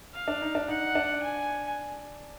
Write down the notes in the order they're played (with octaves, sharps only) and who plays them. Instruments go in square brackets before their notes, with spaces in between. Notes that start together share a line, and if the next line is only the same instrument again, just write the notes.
[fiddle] F5
[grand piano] D4
D#4
D4
[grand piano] D#4 [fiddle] F#5
[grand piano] D4
[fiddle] G#5